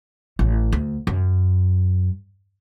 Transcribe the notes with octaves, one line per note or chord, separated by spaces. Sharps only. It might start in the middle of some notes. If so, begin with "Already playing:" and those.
A1
D2
F#2